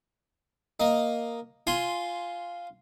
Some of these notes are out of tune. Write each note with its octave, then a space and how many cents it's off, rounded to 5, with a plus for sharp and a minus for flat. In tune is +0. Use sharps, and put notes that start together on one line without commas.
A#3 +0 D#5 +0
F4 +0 G#5 +0 C6 -5